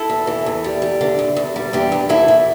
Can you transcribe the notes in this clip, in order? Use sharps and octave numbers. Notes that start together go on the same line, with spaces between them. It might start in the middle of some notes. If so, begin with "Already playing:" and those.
Already playing: E4 A4
E2
E3
E2
G3
G3
D3
E2
E2
G3
E2 D4 G4
E2
E2 E4 A4
E2